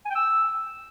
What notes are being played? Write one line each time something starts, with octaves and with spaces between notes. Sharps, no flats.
G#5
G5
E6